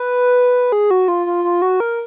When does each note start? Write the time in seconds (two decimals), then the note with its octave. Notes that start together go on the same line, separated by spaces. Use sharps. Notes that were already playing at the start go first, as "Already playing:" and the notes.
Already playing: B4
0.72 G#4
0.91 F#4
1.08 F4
1.26 F4
1.44 F4
1.62 F#4
1.80 A#4